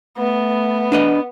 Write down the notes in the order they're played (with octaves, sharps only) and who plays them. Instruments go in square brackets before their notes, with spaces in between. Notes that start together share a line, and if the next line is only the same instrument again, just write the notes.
[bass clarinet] A3 [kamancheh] B3
[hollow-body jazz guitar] D4 B4 D#5